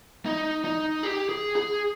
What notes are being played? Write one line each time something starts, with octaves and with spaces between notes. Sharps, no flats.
D#4
D#4
G4
G#4
G#4